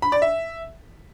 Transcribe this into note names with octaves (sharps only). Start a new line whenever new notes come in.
B5
D5
E5